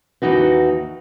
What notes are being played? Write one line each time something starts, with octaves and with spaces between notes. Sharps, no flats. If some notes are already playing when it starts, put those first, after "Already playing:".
D#2 C#3 E3 D#4 F#4 B4